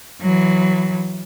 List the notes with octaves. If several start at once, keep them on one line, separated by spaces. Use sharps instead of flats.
E3 F#3